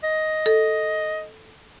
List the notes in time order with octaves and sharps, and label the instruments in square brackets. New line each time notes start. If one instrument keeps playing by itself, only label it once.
[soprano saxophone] D#5
[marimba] A4